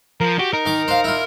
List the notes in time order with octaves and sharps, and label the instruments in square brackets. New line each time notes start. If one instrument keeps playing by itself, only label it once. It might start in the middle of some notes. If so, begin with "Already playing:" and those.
[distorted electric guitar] F3 [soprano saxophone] A#4
[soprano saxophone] F#4 [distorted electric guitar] G4
[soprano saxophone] D#4 [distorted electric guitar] A#4
[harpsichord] D#3 D6
C5 F5
E4 F4